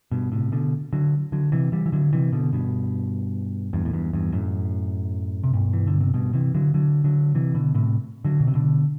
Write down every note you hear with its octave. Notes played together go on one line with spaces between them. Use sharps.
G2 B2
A2 C3
B2 D3
D3 F#3
D3 F#3
C3 E3
E3 G3
E3
D3 F#3
C3 E3
B2 D3
G2 B2
E2 G2
A2
E2 G2
E2 G2
F#2 A2
C3
G2 B2
E3
D3
C3
G2 B2
C3 E3
D3 F#3
D3 F#3
D3 F#3
C3 E3
B2 D3
A2 C3
D3 F#3
B2
C3
B2 D3